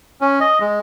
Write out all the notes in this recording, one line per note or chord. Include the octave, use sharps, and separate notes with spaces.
C#4
D#5
G#3